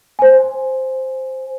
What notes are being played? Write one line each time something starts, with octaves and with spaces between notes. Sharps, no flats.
C5 G#5